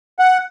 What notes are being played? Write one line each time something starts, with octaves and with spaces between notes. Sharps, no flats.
F#5